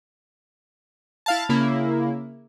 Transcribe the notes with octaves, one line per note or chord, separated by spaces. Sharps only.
E4 F5 A5
C#3 A#3 E4